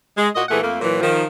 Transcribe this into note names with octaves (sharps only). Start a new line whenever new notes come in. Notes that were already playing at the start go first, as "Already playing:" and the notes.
G#3
A#2 A#3 F#4 D#5
A#2 E3 A3 G#4 F#5
F2 A3 A#3
A#2 E3 F#3
D#3 F3